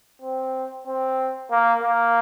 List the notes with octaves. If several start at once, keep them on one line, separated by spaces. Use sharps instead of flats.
C4
C4
A#3
A#3